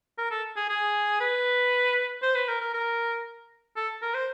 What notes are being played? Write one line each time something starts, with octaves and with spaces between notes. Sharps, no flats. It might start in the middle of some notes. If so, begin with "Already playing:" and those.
A#4
A4
G#4
G#4
B4
C5
B4
A#4
A#4
A#4
A4
A#4
C5